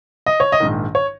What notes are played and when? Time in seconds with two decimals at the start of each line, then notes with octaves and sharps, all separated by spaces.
0.26 D#5
0.40 C#5
0.52 D#5
0.60 A#1 G#2 D#3
0.95 C#5